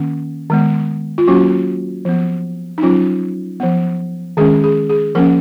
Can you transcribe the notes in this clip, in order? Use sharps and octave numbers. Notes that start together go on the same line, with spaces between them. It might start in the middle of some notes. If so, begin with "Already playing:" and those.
Already playing: D#3 A#3 C#4
D#3 G#3 B3
F4
F#3 A#3 C#4 F#4
F3 B3
D#4
F#3 C#4 F4
F3 B3
D#3 G#3 C#4 G#4
G#4
G#4
F3 A#3 C#4 A#4